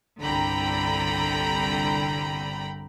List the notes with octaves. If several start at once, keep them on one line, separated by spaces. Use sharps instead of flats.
G1 C2 D3 G5 A#5 B5